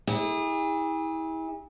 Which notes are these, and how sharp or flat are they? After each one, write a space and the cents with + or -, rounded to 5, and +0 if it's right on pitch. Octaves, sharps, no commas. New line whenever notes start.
E4 -35 G#4 -40